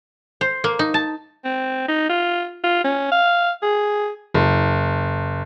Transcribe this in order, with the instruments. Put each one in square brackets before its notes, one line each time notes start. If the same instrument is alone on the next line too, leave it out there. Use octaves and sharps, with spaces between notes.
[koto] C5
A#3
D#4
A5
[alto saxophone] C4
D#4
F4
F4
C#4
F5
G#4
[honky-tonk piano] F#1